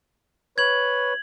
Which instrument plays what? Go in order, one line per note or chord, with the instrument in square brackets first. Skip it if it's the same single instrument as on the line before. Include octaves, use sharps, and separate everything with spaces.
[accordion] B4 C#5 [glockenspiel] G#6 F#7